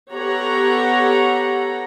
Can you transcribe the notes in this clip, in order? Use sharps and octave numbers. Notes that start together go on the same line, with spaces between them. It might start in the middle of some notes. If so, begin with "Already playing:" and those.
B3 G4 A4 C#5 F#5 A#5